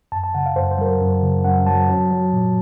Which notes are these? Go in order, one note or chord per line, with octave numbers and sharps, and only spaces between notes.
F#2 A5
A5
C#3 F#5
F5
F#2 C5
C5
F#3 A#4
C5
F#2
C#3
F#2 F#5
F#3 A5
F#3
F#3
A#2